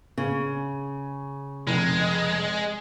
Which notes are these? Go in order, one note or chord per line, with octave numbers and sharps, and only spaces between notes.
C#3
F1 G#3